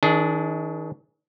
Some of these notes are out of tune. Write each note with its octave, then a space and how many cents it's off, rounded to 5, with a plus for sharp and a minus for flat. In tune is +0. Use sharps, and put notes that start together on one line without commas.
D#3 +35 D4 -15 G#4 +15